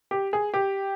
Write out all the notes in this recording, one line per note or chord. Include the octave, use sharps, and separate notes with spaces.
G4
G#4
G4